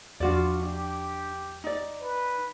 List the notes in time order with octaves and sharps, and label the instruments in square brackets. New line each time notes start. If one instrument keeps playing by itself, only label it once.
[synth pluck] E2 F3 [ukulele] D4 F#4 D5 [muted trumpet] F4
[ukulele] D4 [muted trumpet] G4
[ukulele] D#4 D5
[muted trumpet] B4